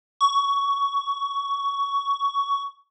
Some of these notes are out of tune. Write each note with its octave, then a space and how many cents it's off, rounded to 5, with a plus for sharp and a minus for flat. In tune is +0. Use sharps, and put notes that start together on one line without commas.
C#6 +15